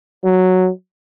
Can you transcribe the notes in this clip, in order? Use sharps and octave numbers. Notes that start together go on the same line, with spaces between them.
F#3